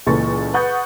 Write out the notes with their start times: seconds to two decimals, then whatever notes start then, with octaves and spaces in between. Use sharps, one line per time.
0.07 C#2 A#2 E3 A4 C#6 A6
0.54 B4 F#5 C#6 D#6 G6 A6